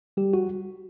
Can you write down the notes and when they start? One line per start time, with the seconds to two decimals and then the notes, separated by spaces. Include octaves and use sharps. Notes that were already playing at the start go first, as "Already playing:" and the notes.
0.17 G3 G4
0.33 F#4